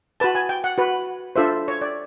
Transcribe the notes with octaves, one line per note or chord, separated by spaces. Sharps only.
F#4 B4 A5
G#5
G5
F#5
F#4 B4
D4 F4 A4 C5 E5
C#5
D5